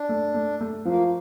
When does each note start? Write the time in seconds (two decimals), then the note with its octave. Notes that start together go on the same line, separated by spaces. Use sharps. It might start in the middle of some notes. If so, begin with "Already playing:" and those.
Already playing: D4
0.09 A3
0.34 A3
0.61 A3
0.85 F3 A#3